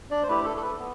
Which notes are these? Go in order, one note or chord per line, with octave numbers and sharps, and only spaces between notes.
D4 D5
C5
A3 E4 G4 B4
A4
A4
B4
B3